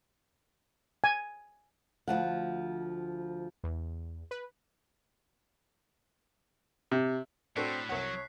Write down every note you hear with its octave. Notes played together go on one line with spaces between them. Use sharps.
G#5
D2 C#3 F3 F#5
E2
B4
C3
A2 C4 D4 F#4 A4 F#6 B6 C7
C2 F#3 C#5 F#5